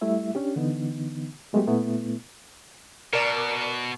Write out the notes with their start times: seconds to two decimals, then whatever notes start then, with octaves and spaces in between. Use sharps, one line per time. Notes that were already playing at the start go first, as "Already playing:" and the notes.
0.01 G3 A3 E4 E5
0.35 C#4 D4 G4
0.56 D3 E3 B3 D#4
1.53 F#3 G#3 A3 B3 F#4 G4
1.68 A#2 A3 B3 E4
3.13 B2 A#4 D5 E7